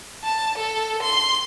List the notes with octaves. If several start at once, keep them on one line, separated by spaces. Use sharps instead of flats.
A5
A4
C6